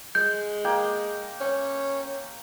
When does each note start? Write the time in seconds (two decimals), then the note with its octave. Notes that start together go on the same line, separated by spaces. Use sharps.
0.15 G#3 G6
0.65 A#3 G5
1.40 C#4